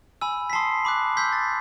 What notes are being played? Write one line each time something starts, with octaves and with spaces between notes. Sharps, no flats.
G#5 B5 E6
B6
A5 C6 D#6 C7
B5 D6 F#6
C6 E6 G6 B6
A6